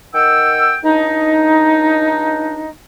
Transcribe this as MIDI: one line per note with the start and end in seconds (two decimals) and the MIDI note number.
0.14 0.76 51
0.14 0.76 78
0.14 0.76 79
0.14 0.76 88
0.84 2.71 37
0.84 2.71 62
0.84 2.71 63